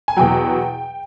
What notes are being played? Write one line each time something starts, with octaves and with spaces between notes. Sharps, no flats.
G#5
E2 B2 F#3 G5